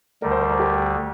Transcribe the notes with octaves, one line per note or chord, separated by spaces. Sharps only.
D2 D3 G3 A#4
C5
C5
A#4
G4